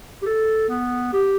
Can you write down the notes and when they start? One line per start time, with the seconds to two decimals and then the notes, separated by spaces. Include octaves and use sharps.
0.22 G4
0.26 A4
0.69 B3
1.13 G4